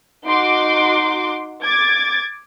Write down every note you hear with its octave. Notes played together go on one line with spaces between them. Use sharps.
D#4 F#4 C6 D6
D6 G#6 A6